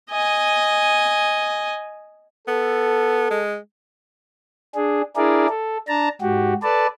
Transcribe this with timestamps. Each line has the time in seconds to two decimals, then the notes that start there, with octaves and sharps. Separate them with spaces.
0.10 D#5 G#5
2.48 B3 A4
3.31 G#3
4.75 D4 G#4
5.16 D4 E4 G#4 A#4 D5
5.49 A4
5.88 D4 A5 A#5
6.21 G#2 F#4 G4
6.63 A4 B4 D5 A5